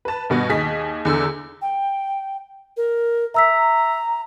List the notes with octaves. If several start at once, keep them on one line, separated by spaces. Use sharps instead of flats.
B4 A5
G2 B2 B3
D#2 G#4 D#5 B6
E2 D3 E6
G5
A#4
E5 A#5 E6 B6